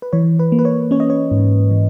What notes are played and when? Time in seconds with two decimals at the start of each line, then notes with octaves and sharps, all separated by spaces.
0.02 B4
0.13 E3 C#5
0.39 B4
0.52 A#3
0.59 B4
0.65 C#5
0.91 C#4 C#5
1.00 D#5
1.10 C#5
1.31 G#2
1.71 E3